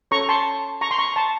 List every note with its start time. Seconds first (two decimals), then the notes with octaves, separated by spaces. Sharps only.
0.11 C#4 A4 C#5 A#5 C#6
0.29 A5 C6
0.81 A#5 C#6
0.91 C6
0.99 A#5 C#6
1.16 A5 C6